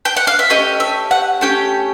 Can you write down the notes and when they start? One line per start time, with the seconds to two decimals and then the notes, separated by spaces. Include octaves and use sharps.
0.05 G5
0.17 F#5
0.27 F5
0.39 E5
0.50 A3 C#4 G4 D#5
0.80 E5
1.11 F#5
1.41 A3 C#4 G4 G5